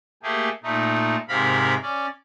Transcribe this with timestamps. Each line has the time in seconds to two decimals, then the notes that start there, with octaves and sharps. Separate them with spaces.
0.23 A3 A#3 G4 G#4
0.63 A#2 A3 D#4
1.28 G#2 C3 A#4 F5 B5
1.82 C#4 D5